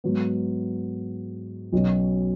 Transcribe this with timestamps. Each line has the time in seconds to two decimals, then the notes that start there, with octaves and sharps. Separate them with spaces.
0.04 G#2 F#3 B3
1.72 B1 B2 F#3 C#4